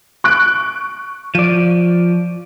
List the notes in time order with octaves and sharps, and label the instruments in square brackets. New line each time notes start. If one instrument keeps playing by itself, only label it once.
[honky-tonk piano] C#6 F#6 D7
[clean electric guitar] F3 D5